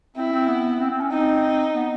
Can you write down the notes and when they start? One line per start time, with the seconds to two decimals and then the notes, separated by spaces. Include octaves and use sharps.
0.16 C4 E4
0.32 C4
0.48 B3
0.80 C4
0.90 C4
1.01 C#4
1.11 C4 D#4
1.75 B3